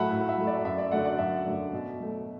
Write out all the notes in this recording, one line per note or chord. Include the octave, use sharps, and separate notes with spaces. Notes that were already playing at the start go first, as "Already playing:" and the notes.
Already playing: A2 F#3 A3 E5 F#5 A5 B5
A2
E5
F#3 A3
D5
F#2 E5
D5
D3 F#3 A3 D5 F#5
D5 F#5
F#2 E5
D3 F#3 A3
B2
F#3 A3